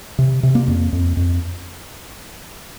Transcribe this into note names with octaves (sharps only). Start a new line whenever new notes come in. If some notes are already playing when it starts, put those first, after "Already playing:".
C3
C3
A#3
F2
F2
F2